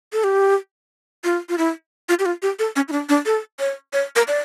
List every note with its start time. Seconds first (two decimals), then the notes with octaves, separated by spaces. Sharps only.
0.13 A4
0.24 G4
1.24 F4
1.49 F4
1.58 E4
2.09 F4
2.19 G4
2.26 F4
2.42 G4
2.59 A4
2.76 C#4
2.88 E4
2.92 D4
3.09 D4
3.26 A4
3.59 C#5
3.93 C#5
4.16 A#4
4.28 D5